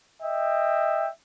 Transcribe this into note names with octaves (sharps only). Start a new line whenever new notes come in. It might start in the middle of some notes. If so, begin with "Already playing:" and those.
D#5 E5 G5